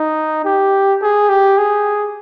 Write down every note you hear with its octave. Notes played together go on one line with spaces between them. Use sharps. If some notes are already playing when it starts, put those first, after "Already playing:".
Already playing: D#4
G4
G#4
G4
G#4